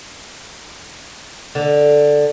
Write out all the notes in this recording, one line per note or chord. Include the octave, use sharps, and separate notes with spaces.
D3